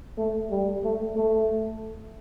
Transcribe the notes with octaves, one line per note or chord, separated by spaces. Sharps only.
A3
G3
A3
A3